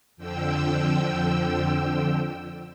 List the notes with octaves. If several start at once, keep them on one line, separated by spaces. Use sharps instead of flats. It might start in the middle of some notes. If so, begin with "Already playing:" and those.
F2 D3 F3 G5 E6